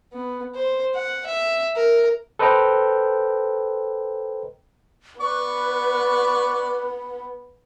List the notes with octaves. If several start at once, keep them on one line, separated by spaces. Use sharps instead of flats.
B3
C5
F#5
E5
A#4
A4 B4 C5 D#5 G5 A#5
B3 B4 D5 C#6